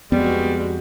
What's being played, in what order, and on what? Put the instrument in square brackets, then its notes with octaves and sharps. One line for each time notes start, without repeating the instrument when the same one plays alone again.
[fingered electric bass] F2 [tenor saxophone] G3 [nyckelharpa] G#3 F#4 [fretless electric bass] B3